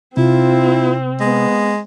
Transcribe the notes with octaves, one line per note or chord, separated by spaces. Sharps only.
C3 C4 E4 F4
G#3 B3